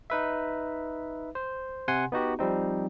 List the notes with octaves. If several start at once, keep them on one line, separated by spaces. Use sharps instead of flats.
D#4 B4 E5
C5
C3 F#5 G#5 C6
B3 D#4 F#4 G4
F3 G3 C4 D#4